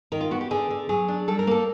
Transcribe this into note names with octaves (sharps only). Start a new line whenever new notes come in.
D#3 A#4
F4
B3 F#4
G4
D3 G#4
D3
F#3 G#4
D4
G3 A4
A#4
A#3 A4